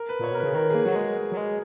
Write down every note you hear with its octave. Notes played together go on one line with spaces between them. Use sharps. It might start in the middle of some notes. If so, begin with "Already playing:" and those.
Already playing: A#4
B4
A#2 C#5
B2 A#4
C#3 B4
D#3 A#4
A#3 G#4
F#3 F#4
G#3
F#3
G#3